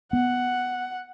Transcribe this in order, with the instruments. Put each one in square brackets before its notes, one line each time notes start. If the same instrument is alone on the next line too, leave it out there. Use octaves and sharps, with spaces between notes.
[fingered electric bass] B3 [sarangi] F#5